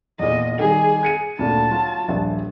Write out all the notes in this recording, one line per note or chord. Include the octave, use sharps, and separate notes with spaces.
E2 A#2 D#5
D#3 G3 G#4
G#6 C#7 D#7
D2 A#2 A5
F#3 F4
D#1 A#1 E5